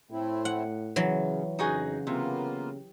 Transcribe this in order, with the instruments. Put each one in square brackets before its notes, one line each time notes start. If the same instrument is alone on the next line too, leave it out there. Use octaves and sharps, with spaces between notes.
[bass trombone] A2 [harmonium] A3 C4 E4
[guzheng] F#5
[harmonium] C#3 [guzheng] E3 F#3
[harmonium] F2 [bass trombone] C#3 [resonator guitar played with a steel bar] D#4 F#4 G#4
[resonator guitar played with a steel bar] C3 [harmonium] A#3 B3 F4